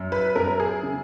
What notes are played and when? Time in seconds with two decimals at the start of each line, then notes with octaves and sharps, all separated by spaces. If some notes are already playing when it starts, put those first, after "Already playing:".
Already playing: F#2
0.12 B4
0.36 F#2 A#4
0.60 G#4
0.83 C#3